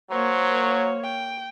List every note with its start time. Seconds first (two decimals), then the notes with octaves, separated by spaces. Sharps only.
0.11 F#3 A#3 C5 C#5
1.03 G5